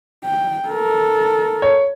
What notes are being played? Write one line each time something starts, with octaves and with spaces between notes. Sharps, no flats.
G5
A4 A#4
C#5